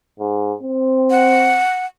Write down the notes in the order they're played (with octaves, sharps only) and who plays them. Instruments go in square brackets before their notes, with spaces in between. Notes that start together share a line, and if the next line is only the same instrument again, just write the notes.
[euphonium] G#2
C4
[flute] F#5